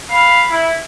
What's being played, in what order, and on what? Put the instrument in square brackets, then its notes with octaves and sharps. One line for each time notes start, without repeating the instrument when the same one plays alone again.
[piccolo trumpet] F5 [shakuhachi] B5
[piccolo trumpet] E4